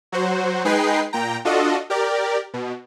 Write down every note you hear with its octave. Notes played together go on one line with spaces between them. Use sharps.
F#3 F#4 C5
G#3 D#4 G#4 B4 G5 C7
A#2 G5 A#5
D4 F4 F#4 A4 D#5
G4 A#4 D5
B2